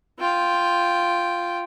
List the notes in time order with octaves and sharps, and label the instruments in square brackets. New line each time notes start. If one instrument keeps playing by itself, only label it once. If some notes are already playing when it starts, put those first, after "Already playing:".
[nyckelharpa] F4 G5